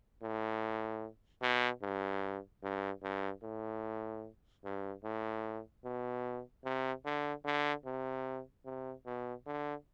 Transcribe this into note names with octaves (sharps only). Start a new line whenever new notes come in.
A2
B2
G2
G2
G2
A2
G2
A2
B2
C3
D3
D3
C3
C3
B2
D3